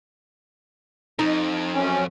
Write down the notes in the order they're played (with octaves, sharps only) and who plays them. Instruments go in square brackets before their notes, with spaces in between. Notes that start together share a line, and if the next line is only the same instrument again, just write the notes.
[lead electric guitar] F2 [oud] D#4
[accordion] F#2 C#4